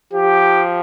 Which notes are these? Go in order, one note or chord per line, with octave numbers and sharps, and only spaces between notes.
F3 G4